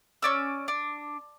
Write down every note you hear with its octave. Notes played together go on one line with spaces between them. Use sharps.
C#4 D5 E6
D4